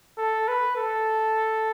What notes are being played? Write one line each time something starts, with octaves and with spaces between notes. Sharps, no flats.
A4
B4
A4